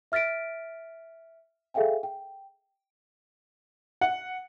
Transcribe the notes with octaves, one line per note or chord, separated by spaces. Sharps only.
E5 F6 A6 B6 D7
G#4 A4 E5 F5 G5 G#5
G5
F#5